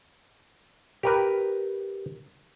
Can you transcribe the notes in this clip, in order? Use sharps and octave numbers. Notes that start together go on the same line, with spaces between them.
G4 A#4 B4